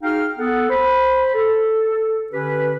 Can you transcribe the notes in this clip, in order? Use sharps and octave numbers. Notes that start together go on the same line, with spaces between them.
D#4 F#4 G#4 F5 G5 F6
B3 A4 F#5
C5 B5
A4
D3 C#4 G4 B4